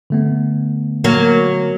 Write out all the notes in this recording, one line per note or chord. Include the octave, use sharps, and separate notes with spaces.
D3 A3 B3
F#3 A#3